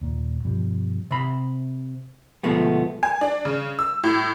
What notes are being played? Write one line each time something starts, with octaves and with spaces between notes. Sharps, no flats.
D#1 A#2
G2 B2 F3 G3
C3 B5
D2 B2 F3 G#3 A3 B3
G#5
D4
C#3
E6
A2